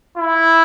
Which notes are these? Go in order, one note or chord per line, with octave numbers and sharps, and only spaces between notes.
E4